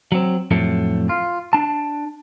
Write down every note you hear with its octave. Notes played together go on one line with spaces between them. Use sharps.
F#3 C4
F2 A2 F#3 A3
F4
D4 A5